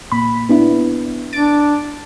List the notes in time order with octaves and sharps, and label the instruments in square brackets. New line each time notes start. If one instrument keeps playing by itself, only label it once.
[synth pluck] A#2 B5
B3 D4 E4
[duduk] D4 [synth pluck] A6 D7